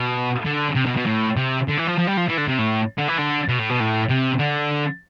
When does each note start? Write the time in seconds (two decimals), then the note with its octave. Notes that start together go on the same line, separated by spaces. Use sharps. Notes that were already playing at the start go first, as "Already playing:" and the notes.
Already playing: B2
0.46 D3
0.76 C3
0.87 B2
0.97 B2
1.07 A2
1.36 C3
1.68 D3
1.77 E3
1.87 F3
1.98 F3
2.07 G3
2.17 F3
2.29 E3
2.37 D3
2.48 C3
2.58 A2
2.98 D3
3.09 E3
3.19 D3
3.49 B2
3.59 A2
3.70 B2
3.80 A2
4.10 C3
4.40 D3